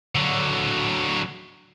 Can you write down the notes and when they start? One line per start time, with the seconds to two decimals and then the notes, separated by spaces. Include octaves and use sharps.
0.15 D3 F#3